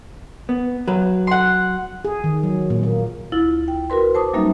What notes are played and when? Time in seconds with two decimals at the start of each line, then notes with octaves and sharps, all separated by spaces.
0.49 B3
0.87 F#3 B4
1.27 F#5 C6
2.05 G#4
2.24 D#3
2.43 F#3
2.70 A#2
2.83 A#3
3.32 D2 E4 F4 A6
3.68 G5
3.90 F#4 A#4 B4 C6
4.15 C5 A5 D6 D#6
4.33 F#3 G3 A#3 C#4 D#4 E5